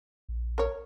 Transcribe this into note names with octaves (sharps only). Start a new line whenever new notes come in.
A#1
A#4 C#5